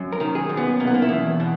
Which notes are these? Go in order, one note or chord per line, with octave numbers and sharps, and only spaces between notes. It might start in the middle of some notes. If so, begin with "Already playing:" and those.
Already playing: F#2
A#4
D#3
G#4
F#2
B3
B2 A#3
B3
A#3
E4
E2
B2